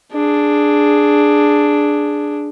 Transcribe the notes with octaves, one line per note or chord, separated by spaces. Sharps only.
D4 G#4